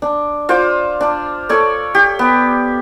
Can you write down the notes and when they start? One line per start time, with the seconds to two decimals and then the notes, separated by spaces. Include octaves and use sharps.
0.02 D4
0.49 F4 C5 D6
1.01 D4
1.49 A4 C#5 D5
1.95 G4
2.19 B3